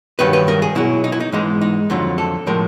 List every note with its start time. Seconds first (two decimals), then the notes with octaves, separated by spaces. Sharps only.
0.19 G2 D#3 F#3 B4
0.33 B4
0.48 A#4
0.62 G#4
0.75 B2 F#3 E4
1.04 D#4
1.12 E4
1.20 D#4
1.32 G#2 E3 G#3 D#4
1.61 D#4
1.90 F2 D3 F#3 F4
2.18 A4
2.47 A2 F3 G#3 A#4